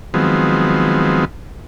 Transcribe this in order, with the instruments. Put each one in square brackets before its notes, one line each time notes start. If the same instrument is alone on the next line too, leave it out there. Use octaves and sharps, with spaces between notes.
[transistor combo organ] D#3 F3 F#3 G#3 B3 C4